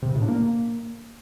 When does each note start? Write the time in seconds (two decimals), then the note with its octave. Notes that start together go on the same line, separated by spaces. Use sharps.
0.02 C3
0.09 C#3
0.15 A2
0.22 D4
0.28 A#3